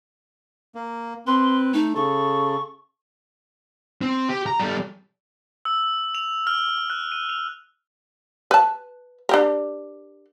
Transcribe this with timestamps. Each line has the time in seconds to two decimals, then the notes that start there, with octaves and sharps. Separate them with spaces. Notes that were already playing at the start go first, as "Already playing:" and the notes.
0.75 A#3
1.27 C4 B4 C6
1.74 A3 D#4
1.96 C#3 A4 C#6
4.02 C4
4.29 G4
4.46 A#5
4.59 G3 A4
5.65 E6
6.15 F7
6.47 F6
6.90 F#6
7.12 D#7
7.29 F7
8.51 B4 A5
9.29 D4 G4 A#4